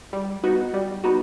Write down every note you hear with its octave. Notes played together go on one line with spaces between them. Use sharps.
G3
B3 D#4 F#4
G3
B3 D#4 F#4